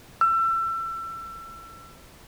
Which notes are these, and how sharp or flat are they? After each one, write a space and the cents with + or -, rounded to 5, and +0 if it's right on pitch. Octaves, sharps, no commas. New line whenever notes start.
E6 +30